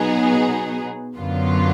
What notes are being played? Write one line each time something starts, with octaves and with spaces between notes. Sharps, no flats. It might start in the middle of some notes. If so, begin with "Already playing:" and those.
Already playing: B2 F#3 B3 D#4 G#4
F#2 D3 F#3 B3 F4